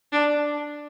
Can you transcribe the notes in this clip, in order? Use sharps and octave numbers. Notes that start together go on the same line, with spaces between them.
D4